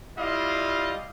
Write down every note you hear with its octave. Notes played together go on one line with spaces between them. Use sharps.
G3 E4 F4 D5 D#5 F5